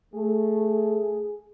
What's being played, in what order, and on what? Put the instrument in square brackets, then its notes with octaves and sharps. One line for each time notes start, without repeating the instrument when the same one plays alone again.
[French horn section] A3 [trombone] G#4